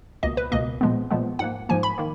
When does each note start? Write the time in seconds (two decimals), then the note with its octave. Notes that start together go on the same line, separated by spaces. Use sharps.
0.23 C#2 B2 A#3 D#5
0.37 B4
0.52 C#2 B2 A#3 D#5
0.81 A#2 F3 G#3 B3
1.11 A#2 F3 G#3 B3
1.39 G#2 F3 A#3 F#5
1.69 G#2 F3 A#3 G#5
1.83 B5
1.98 D#3 A#3